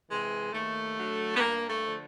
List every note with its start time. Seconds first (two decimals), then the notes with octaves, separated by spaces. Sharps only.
0.09 C3 E3 G#3
0.53 D#2 A3
0.96 D3 F#3
1.35 B3
1.39 G2 A#3
1.69 A3
1.83 D3 F3